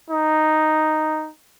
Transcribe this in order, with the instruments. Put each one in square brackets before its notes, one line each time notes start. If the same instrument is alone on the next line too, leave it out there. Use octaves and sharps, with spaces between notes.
[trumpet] D#4